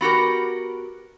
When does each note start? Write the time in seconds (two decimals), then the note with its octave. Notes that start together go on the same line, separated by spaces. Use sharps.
0.01 B3 F#4 G4 A#4